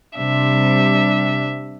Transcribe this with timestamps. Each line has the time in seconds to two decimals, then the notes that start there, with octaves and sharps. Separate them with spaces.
0.17 C3 G3 D4 E5